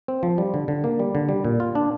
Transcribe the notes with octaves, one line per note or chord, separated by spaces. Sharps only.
C4
F3
G3
D3
D3
A#3
G3
D3
G3
A#2
F4
D4